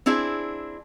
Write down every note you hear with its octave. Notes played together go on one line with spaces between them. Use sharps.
C4 D4 E4 G#4